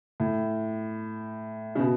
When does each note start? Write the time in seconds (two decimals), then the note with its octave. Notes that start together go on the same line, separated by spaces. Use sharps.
0.20 A2
1.75 C#3
1.79 B2